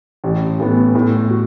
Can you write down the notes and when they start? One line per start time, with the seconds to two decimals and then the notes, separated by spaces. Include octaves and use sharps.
0.24 A1
0.59 A2 E3 B3
0.95 A2
1.30 F#4